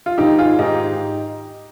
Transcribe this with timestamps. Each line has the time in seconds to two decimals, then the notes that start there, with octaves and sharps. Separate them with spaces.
0.06 F4
0.18 G#2 D#3 D#4 G4
0.38 F4 G#4
0.59 G#2 D#3 D#4 G4